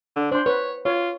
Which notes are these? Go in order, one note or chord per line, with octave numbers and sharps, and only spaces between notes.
D3
D4 C5 C6
B4 C#5
F4 C#5